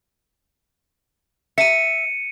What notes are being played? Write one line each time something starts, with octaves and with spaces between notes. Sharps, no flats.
E5 C#7 D#7